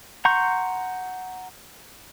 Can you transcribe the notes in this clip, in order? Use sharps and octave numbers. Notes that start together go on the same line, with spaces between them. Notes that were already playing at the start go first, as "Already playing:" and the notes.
F#5 A#5 C6 C#6 G6